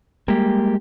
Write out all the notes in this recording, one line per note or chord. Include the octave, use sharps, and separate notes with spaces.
G3 G#3 A#3 G4